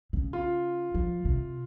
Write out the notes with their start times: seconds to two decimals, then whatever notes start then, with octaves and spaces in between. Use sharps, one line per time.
0.13 C#3
0.33 F4
0.94 F3
1.25 C3